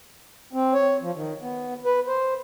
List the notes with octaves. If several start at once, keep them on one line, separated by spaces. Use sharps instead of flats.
C4
C#5
F3
D#3
B3
B4
C5